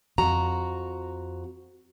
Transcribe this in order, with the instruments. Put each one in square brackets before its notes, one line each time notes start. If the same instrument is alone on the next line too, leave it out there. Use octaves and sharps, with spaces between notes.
[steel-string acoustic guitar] F2 F#4 A#5